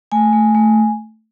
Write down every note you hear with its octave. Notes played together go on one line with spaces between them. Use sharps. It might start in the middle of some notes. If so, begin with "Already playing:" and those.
A3 G#5
A3
A3